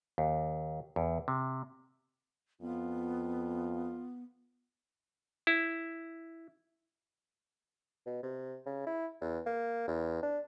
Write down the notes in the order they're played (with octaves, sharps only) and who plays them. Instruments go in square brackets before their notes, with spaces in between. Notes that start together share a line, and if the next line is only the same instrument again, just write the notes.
[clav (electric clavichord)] D#2
E2
C3
[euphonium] F2 [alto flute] B3 [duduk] F4
[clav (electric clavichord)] E4
[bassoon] B2
C3
C#3
E4
E2
A#3
E2
D4